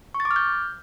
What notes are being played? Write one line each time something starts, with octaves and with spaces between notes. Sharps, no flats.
C#6
A6
D6
F6
G6